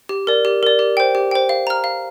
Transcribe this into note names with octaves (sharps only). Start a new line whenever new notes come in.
G4
A#4 D5
G4
A#4 D5
G4
C5 G5
G4
C5 G5
F5
A#5 F6
F5